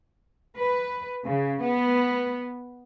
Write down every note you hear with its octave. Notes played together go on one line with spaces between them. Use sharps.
B4
C#3
B3